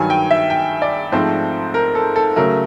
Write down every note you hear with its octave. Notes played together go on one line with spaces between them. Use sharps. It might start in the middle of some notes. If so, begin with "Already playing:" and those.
Already playing: G2 D#3 F#3 G#5
G5
E5
G5
D5
G#2 F3 A3 C4 C5
A#4
A4
A4
C#3 F#3 A3 A#4